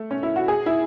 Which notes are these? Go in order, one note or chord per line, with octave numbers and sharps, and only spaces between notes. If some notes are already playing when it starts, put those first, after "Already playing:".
Already playing: A3
C#4
E4
F#4
G#4
E4